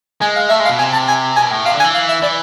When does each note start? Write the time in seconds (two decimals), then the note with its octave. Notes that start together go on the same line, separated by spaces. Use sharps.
0.21 G#3 G#5
0.36 F5
0.50 A3 E5
0.60 G#3
0.65 F5
0.69 B2
0.79 C3 G#5
0.93 A5
1.08 G#5
1.36 B2 G#5
1.51 A2
1.65 C3 F5
1.74 D3
1.80 G#5
1.84 E3
1.94 F5
2.08 E5
2.22 E3 D5